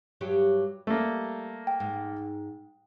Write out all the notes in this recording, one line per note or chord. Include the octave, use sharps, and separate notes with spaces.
G2 F#3 G4
G3 A3 A#3
G5
G#2